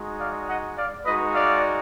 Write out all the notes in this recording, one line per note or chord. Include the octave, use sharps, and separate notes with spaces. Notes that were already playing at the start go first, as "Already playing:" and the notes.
Already playing: G#3 D#4 F#4
D5 F5
D#5 F#5
D5 F5
G#3 D#4 F#4 B4 D#5
D5 F5